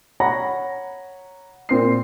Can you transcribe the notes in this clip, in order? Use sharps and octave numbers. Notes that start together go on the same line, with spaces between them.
C#5 F#5 A#5 B5 A#6
A#2 C4 C7